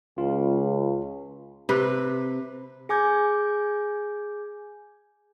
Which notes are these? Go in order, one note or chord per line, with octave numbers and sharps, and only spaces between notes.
C#2 F4
C3 B4
G#4 G#5 D6 G6 G#6